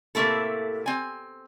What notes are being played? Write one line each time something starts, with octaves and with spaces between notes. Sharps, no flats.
A2 C3 A3 A#3 A4
C4 G#5